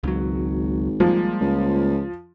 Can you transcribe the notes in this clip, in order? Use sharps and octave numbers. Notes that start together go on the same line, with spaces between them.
G#1 C#2 F#3
F3 G3 G#3 A#3
C#2